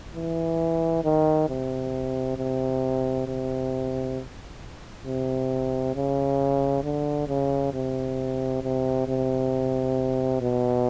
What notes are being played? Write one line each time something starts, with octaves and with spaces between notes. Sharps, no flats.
E3
D#3
C3
C3
C3
C3
C#3
D3
C#3
C3
C3
C3
B2